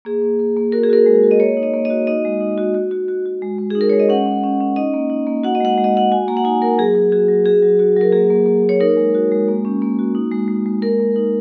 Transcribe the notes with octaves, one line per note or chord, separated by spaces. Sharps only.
A#3 G#4
A#3
A#3
A#3
F#4 A#4
G#4
F#4 A#4
G#3
F#4
D#5
A#3 C#5
D#4
D#5
A#3
D#5
F#4
D#4 D#5
G#3
D#4
F#4
F#4
F#4
F#4
F#4
G#3
G#3
G#4
D#4
A#4
G#3 C#5
D#5
C#4 F#5
C#4
C#4
C#4
D#4 D#5
A#3
D#4
A#3
F#4 F#5
D#5
G#3 F#5
G#3
D#5
G#3 F#5
F#4 G#5
A#3 A#5
F#5
D#4 G#5
A#3 A#4
F#3 G#4
F#3
F#4 G#4
F#3
F#4 G#4
F#3
F#4
F#3 A#4
A#3 G#4
A#3
A#3
A#3
C#5
D#4 A#4
G#3
F#4
G#3
A#3
C#4
A#3
F#4
D#4
G#3
G#3
G#3
A#3 A#4
A#3
D#4